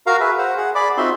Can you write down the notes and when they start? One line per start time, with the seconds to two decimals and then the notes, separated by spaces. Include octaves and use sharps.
0.07 F#4 A#4 F5 A#5
0.20 G#4 B4 E5
0.38 C5 F#5
0.57 G#4 F#5
0.75 G#4 D5 B5 D6
0.97 C4 D#4 F4 F#4 E5 C6